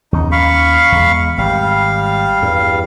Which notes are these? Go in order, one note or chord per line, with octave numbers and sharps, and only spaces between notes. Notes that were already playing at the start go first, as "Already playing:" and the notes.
D#2 C#4 D#4
F5 B5 C#6
E2 G#3
G#1 G3 F5
E2 G2